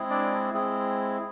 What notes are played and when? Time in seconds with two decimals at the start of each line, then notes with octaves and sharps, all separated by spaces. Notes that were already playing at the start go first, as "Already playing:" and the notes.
Already playing: G#3 C4 E4 G#4
0.10 D4 D5
0.53 G#3 C4 E4 G#4